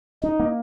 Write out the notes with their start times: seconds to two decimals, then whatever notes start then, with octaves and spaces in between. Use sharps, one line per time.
0.23 C#4 D#4
0.40 A#3